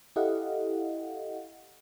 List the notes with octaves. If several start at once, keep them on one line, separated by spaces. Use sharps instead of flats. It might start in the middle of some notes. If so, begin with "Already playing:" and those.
E4 G4 A4 D#5 F5 F#5